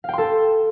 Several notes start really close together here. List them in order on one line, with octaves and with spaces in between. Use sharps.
F5 G5 C6 A4